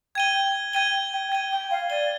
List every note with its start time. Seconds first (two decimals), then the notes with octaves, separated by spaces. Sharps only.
0.15 G5 G#6 D#7 G7
0.73 G5 G#6 D#7 G7
1.13 G5
1.32 G5 G#6 D#7 G7
1.51 G5
1.70 F5
1.90 D5 G#6 D#7 G7